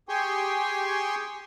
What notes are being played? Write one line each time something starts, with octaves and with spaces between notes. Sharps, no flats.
G4 G#4 G5 G#5 C6 C#6